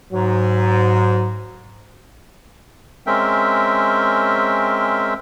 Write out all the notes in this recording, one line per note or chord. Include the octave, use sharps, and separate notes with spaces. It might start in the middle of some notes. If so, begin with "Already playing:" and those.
G#2 F#3
G#3 C4 C#4 A#4 E5 G5